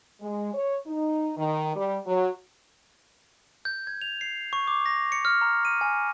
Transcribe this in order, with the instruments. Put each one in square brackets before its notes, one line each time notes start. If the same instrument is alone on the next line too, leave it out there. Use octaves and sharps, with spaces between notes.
[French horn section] G#3
C#5
D#4
D#3
G3
F#3
[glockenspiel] G6
G#6
F7
C7
C#6
D6
A#6
C#7
F6
A#5
D#7
G#5